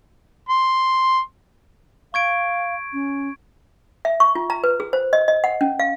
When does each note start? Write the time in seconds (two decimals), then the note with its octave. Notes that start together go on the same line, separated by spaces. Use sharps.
0.49 C6
2.14 F5 C#6 G#6 D7
2.93 C#4
4.05 E5
4.20 C#6
4.35 F4
4.50 A#5
4.64 B4
4.80 G#4
4.93 C5
5.13 D#5
5.28 D#5
5.44 F#5
5.61 C#4
5.79 F5